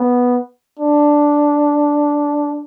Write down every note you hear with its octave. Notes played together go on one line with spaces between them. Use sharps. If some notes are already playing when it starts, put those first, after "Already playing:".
Already playing: B3
D4